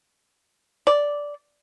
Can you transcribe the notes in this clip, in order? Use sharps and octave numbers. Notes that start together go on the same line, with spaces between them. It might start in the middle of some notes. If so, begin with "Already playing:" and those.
D5